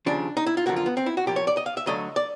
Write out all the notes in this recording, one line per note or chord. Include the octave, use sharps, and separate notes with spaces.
D#2 C#3 F3 D4
D#4
E4
F4
F#2 D3 F3 A#3 F#4
F4
B3
C4
E4
F#4
A#2 F3 A#3 G4
C#5
D5
D#5
F5
E5
D2 D3 F#3 A3 D#5
D5